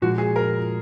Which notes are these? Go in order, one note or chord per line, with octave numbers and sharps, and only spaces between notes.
A#2 F3 G#3 F#4
G#4
A#4